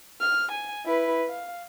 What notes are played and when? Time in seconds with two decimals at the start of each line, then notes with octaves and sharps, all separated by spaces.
0.21 F6
0.52 G#5
0.86 E4 B4
1.28 F5